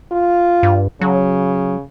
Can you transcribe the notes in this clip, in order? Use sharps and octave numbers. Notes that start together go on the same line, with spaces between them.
F4
G2
C#3 F#3